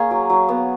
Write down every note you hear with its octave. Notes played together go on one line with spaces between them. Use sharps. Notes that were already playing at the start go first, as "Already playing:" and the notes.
Already playing: A#3 C#4 G#4
F#3
F#3
B3